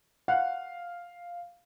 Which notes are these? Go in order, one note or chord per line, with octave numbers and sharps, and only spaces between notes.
F5 F#5